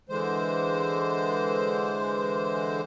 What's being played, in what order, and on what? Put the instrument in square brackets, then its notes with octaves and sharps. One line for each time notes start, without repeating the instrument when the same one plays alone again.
[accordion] D3 E3 G#3 C5